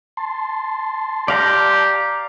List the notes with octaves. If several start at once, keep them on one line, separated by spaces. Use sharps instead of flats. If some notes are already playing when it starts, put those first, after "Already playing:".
A5 C6
G4 D5 F5 A#5